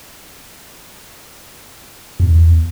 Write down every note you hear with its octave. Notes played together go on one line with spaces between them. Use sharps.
E2